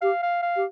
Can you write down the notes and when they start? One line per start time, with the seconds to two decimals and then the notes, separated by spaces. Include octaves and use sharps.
0.02 G4 F5
0.23 F5
0.42 F5
0.56 G4